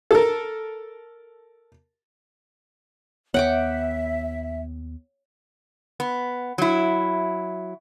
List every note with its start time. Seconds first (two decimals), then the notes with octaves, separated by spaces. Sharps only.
0.11 A4 A#4
3.34 D#2 B3 C#5 E5 F#5 G5 D6
6.00 B3
6.58 F#3 E4